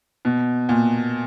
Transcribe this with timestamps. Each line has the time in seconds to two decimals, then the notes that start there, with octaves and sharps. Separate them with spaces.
0.25 B2
0.69 A#2